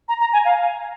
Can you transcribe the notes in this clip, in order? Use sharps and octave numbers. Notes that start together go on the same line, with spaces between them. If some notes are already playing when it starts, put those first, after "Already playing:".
A#5
A#5
G#5
F5